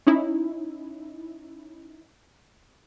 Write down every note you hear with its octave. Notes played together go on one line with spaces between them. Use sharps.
C#4 D#4 E4